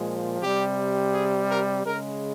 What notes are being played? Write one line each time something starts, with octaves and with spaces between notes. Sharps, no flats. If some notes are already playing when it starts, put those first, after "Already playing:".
Already playing: A#2 F3 G#3
C3 G3 G4
G#4
A#4
C#3 G#3 A#4